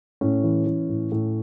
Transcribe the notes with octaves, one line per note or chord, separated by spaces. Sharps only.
A2 C#4
E3
E3
A2
A2